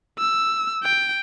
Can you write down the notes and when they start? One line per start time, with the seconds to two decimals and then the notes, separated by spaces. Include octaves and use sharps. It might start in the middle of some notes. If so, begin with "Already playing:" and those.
0.19 E6
0.83 G5